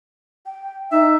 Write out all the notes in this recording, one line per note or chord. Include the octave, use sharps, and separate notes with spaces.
G5
D#4 E5